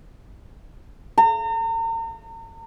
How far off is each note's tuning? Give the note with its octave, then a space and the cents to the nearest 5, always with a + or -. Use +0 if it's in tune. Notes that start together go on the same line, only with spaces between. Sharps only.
A#5 -40